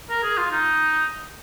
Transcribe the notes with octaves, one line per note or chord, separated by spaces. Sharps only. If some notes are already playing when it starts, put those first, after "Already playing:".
A#4
G#4
F4
D#4